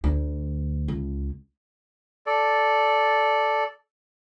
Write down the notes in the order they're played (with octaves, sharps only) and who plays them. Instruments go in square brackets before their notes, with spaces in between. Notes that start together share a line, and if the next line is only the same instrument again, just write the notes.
[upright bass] D2
C#2
[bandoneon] A4 D5